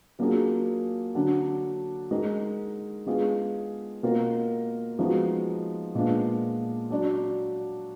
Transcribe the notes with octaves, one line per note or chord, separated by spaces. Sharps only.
F#3 A#3 D4 F4 G#4
D3 F#3 D4
G#3 D#4 A#4
G#3 B3 D4 F4 G#4
B2 A#3 F4 A#4
F3 G#3 B3 D#4 F#4
A#2 G#3 B3 D4 F4
F#3 D4 F#4 D5